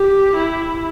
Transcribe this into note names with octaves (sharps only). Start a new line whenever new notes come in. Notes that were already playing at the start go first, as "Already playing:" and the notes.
Already playing: G4
E4